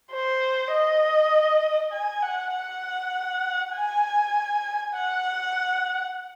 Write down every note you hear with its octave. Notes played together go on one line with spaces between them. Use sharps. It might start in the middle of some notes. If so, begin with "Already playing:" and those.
C5
D#5
G#5
F#5
F#5
G#5
F#5